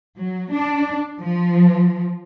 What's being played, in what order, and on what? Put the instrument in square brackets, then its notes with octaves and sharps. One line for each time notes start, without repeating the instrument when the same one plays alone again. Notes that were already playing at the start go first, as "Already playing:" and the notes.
[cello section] F#3
D4
F3